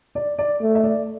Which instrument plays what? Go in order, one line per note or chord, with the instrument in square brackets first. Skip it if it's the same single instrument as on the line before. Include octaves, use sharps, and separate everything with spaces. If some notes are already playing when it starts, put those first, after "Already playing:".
[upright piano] D5
D5
[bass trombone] A3
[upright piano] E5
D5